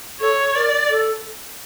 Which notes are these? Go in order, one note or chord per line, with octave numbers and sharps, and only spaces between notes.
A4 C#5
A#4 D5
A4